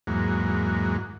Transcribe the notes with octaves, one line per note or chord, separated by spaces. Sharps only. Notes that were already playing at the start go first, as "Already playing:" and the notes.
E2 G#2 F#3 A#3